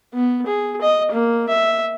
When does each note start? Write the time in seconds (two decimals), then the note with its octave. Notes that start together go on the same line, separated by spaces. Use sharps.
0.14 B3
0.46 G#4
0.81 D#5
1.11 A#3
1.49 E5